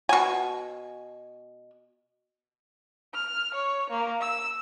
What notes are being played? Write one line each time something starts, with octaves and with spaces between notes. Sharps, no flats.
B2 G#5
F6
C#5
A#3
E6